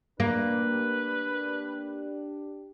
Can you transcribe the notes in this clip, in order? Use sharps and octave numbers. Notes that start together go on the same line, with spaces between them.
A#3 D4 G4 B4